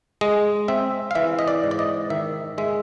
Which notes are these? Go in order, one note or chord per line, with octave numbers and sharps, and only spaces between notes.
G#3 D#5
C4 E5
F5
E3 E5
D#5
D5
G#2
D5
D#5
D#3 E5
G#3 E5